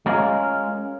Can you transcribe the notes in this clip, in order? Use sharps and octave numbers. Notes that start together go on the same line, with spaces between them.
G#3 C#4 F4 A#4